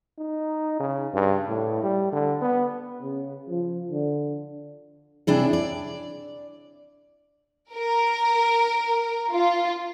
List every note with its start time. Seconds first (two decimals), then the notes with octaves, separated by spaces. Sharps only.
0.18 D#4
0.80 C#3
1.14 G2
1.48 A2
1.83 G3
2.12 D3
2.42 B3
3.02 C#3
3.49 F3
3.91 D3
5.27 C3 D4 E4 G#4
5.53 D5
7.74 A#4
9.32 F4